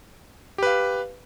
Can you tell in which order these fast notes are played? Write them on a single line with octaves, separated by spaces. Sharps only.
G4 B4 F5